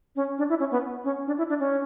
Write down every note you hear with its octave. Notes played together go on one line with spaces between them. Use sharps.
C#4
D4
E4
C#4
B3
C#4
D4
E4
D4
C#4